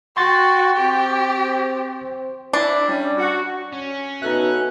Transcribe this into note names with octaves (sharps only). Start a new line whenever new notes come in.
F#4 G5 C6 C#6 A6
C4 G4 C5
D4 E4
G3 C#4
F#4
C#4
B2 D#4 A4 E5 F#6